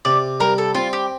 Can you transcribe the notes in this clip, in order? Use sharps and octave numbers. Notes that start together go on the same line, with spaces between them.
C3 D5
G3 A#4
A4
C4 F4
G4